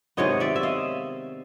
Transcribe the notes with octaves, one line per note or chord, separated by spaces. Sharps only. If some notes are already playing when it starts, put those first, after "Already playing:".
C3 D#3 G#3 B3 C#5 D#5
D5 E5
E5
D#5 F5